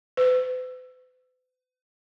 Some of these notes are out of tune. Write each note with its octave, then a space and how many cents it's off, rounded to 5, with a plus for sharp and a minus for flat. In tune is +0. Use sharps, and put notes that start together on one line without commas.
B4 +45